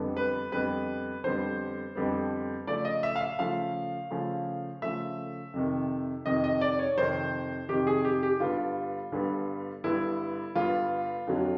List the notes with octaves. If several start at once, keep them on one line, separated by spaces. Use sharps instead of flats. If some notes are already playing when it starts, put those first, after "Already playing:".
Already playing: F2 D3 G3 B3
B4
F2 D3 G3 B3 B4
F2 D3 G3 B3 C5
F2 D3 G3 B3
C#3 F3 A3 D5
D#5
E5
F5
E5
C#3 F3 A3 F5
C#3 F3 A3
C#3 F3 A3 E5
F2 C3 D#3
F2 C3 D#3 D#5
D#5
D5
C#5
F2 C3 D#3 C5
F2 C3 D#3 G4
G#4
G4
G4
G2 D3 G3 B3 F4
G2 D3 G3 B3
G2 D3 G3 B3 E4
G2 D3 G3 B3 F4
F2 D3 F#3